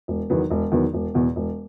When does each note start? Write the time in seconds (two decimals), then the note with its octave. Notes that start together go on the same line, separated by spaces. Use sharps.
0.08 E1
0.30 E2 D#3 F#3 B3
0.50 E1
0.72 E2 D#3 F#3 B3
0.94 E1
1.15 E2 B2
1.36 E1